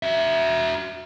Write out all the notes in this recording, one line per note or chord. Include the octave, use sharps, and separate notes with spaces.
F#4 E5